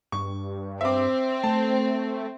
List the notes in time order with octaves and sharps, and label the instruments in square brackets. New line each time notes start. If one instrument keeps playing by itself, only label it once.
[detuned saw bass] G2 [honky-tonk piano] C#6
[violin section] C4 [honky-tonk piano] E5 D6
[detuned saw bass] A3 [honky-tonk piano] A5